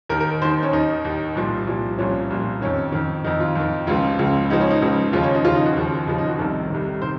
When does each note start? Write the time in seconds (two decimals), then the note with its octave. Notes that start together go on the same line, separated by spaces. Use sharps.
0.09 D#2 D#3 A#4
0.20 A#4
0.42 D#2 D#3 C5
0.63 C#4
0.73 D#2 D#3 D#4
1.05 D#2 D#3
1.35 C2 A#2 F3
1.67 C2 A#2 F3
1.98 C2 A#2 F3 C#4
2.30 C2 A#2 F3
2.61 F2 D#3 C#4
2.92 F2 D#3
3.24 F2 D#3 D#4
3.40 F4
3.55 F2 D#3
3.87 C#2 C#3 F3 F4
4.19 C#2 C#3 F3
4.50 C#2 C#3 F3 D#4
4.61 C#4
4.71 D#4
4.82 C#2 C#3 F3
5.13 D#2 C#3 F3 F4
5.23 C#4
5.35 D#4
5.45 D#2 C#3 F3 F4
5.55 D#4
5.66 F#4
5.76 D#2 C#3 F3
6.07 D#2 C#3 F3 D#4
6.18 D#4
6.28 F#4
6.38 C2 C3 D#3 A4
6.70 C2 C3 D#3
7.02 C3 D#3 C5